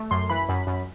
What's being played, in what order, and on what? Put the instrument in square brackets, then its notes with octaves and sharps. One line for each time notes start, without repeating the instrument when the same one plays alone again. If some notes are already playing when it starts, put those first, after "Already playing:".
Already playing: [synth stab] A3
F#2 C6
E3 B5
F#2
F#2